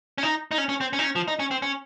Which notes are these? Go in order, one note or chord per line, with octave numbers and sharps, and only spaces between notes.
C#4
D#4
D#4
C#4
C#4
C4
C#4
D#4
C#4
F3
D#4
C#4
C4
C#4